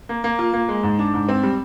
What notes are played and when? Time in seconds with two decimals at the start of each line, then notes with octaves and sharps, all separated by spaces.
0.09 A#3
0.24 A#3
0.39 F4
0.53 A#3
0.69 G#3
0.83 G#2
0.99 D4
1.14 G#2
1.29 C4
1.43 G3